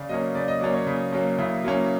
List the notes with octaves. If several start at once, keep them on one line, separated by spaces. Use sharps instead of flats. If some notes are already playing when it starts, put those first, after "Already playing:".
Already playing: C#3 D5
F#3 A#3 C#4 D#5
C#3 D5
D#5
F#3 A#3 C#4 D5
C#5
C#3
F#3 A#3 C#4
C#3 E4
F#3 A#3 C#4